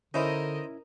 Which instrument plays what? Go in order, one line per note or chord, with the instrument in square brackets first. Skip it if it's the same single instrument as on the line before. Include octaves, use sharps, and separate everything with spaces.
[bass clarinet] D3 [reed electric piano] C#4 E4 [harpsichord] D#4 C5 [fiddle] A#4 D#5